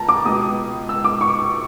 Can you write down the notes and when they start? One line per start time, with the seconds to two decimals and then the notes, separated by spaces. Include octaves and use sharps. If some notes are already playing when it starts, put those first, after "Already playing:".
Already playing: C#2 A5 A#5
0.09 D6
0.25 C#2 B2 D#6
0.89 E6
1.04 D6
1.21 C#6